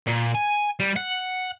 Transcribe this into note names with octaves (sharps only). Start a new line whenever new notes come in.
A#2
G#5
G3
F#5